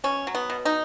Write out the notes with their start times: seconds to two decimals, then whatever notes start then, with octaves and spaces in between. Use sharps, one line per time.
0.04 B2 C#4
0.27 F#3
0.35 B3
0.50 B2
0.65 D#4